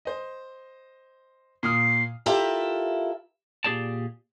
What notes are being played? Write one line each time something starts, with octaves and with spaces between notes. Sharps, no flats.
C5 D#5
A#2 D#6 F6 C7
E4 F4 G4 A4 A#4 E5
A#2 G4 G#4 D5 A5